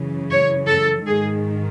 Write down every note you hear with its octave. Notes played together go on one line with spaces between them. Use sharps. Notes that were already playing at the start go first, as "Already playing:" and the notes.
Already playing: F#2 C#3 E3
C#5
A4
G#2 D#3 G#3 G#4